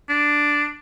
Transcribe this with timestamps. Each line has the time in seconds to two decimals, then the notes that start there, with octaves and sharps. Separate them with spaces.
0.09 D4